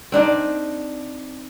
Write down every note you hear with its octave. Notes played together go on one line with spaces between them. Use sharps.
C4 D4 D#4